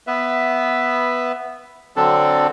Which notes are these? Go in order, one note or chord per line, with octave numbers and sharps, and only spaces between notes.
B3 B4 E5
D3 F#3 C4 D4 A4